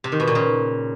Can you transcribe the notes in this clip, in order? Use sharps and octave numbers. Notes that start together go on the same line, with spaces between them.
C3
D#3
B2
A#2
C#3